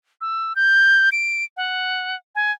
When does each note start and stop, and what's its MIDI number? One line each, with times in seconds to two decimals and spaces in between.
0.21 0.56 88
0.56 1.10 91
1.12 1.44 98
1.57 2.16 78
2.35 2.52 80